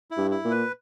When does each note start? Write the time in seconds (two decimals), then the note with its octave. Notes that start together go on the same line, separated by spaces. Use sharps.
0.11 E4
0.17 G2
0.31 E4
0.45 A#2
0.51 B4